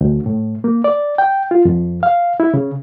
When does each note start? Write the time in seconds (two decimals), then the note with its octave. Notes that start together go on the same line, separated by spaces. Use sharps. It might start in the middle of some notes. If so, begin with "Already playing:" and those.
0.01 D2
0.26 A2
0.64 A#3
0.84 D5
1.18 G5
1.51 F4
1.65 F2
2.03 F5
2.40 E4
2.54 C#3